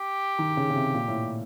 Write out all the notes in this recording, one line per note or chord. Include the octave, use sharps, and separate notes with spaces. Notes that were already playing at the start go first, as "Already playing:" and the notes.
Already playing: G4
D#3
C#3
C#3
C3
A#2
A2